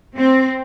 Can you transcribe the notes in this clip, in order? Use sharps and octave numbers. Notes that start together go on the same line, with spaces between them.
C4